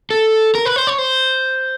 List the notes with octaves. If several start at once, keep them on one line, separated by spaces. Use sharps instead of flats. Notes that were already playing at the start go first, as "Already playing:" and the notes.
A4
A#4
B4
C5
C#5
C5